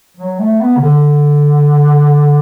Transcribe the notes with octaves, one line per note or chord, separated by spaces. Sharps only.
F#3
A3
B3
C#3
D3